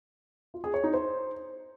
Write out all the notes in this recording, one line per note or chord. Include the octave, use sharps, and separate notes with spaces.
F4
G#4
C#5
D#4
C5